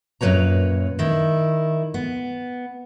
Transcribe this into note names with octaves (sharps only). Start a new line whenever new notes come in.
F#2 A#2 B3 B4 C#5 A#5
D#3 E4
B3